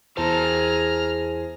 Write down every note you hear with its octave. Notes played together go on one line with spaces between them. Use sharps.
E2 E4 G#4 C5 A5 A#5 F6